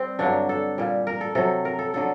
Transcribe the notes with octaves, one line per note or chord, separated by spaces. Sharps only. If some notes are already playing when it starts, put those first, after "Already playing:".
Already playing: G3 C4
G2 D3 F#3 D4
A4
A#2 G3
A#4
A4
C3 F#3 A4
A#4
A4
D3 F#3 A4